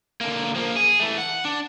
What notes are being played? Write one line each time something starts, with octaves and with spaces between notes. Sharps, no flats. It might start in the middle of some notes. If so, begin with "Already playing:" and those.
D3 A#3
F3 A#3
G#4
E3 A3
F#5
D4